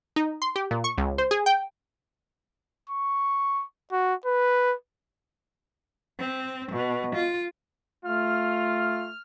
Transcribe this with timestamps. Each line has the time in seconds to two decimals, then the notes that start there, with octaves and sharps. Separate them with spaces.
0.16 D#4
0.42 C6
0.56 G4
0.71 A#2
0.84 C#6
0.98 C#2
1.18 C5
1.31 G#4
1.46 G5
2.90 C#6
3.92 F#4
4.26 B4
6.19 C4
6.72 B2
7.15 F4
8.05 A3 F4 F6